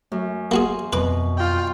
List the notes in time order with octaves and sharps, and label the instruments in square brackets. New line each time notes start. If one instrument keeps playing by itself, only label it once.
[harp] F#2 [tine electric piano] A3
[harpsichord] A#3 F#4 G#4 [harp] C6
[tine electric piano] F2 [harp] B2 [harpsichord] B4 D6
[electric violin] F4 G5